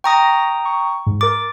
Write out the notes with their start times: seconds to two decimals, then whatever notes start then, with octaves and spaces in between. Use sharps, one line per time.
0.04 G5 A#5 C#6 D#6 A#6
0.65 C#6
1.07 G#2
1.21 A#4 D6 A6